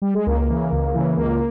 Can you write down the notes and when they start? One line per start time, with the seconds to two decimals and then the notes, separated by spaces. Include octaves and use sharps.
0.02 G3
0.14 G#3
0.26 C#2 A#3
0.49 C#3 E3
0.72 C#2
0.94 C#3 E3
1.17 C#2 A#3